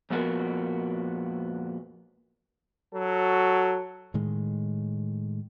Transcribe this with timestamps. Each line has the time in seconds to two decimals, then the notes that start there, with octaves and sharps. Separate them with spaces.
0.10 F2 A#2 B3 F#4 A#4
2.93 F#3 F#4 A4
4.14 A2 D#3 G#3